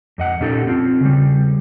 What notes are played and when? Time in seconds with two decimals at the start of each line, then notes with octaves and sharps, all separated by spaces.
0.18 F2 D#5 F#5
0.40 A#2 C#4 D#4 G4 A4
0.67 C4 F4
1.01 C#3 G3